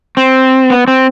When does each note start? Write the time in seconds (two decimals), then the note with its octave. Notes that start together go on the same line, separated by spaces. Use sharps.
0.17 C4
0.70 B3
0.88 C4